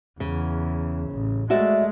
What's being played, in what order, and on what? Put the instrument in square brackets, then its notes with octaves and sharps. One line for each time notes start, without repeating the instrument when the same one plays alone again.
[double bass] E2 [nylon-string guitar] C#3
[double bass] A1
[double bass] G#3 A3 [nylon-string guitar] F#4 D5 E5